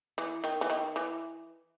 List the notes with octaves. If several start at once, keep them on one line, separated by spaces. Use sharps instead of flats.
E3
D#3
E3
D#3
E3